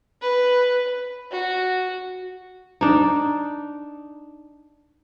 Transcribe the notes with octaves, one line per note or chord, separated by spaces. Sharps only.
B4
F#4
D4 D#4